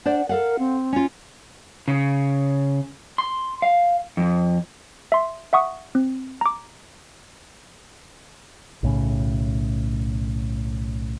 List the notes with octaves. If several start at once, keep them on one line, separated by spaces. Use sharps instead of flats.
D4 C5 D5 F#5
A4 A#4 F5 F#5
C4
C#4 F4
C#3
C6
F5
F2
E5 C6
E5 F#5 C#6 D#6
C4
A#5 D6
B1 A2 C#3